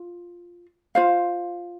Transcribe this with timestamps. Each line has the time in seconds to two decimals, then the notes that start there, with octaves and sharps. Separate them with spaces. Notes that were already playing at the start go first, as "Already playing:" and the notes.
Already playing: F4
0.95 F4 C5 F5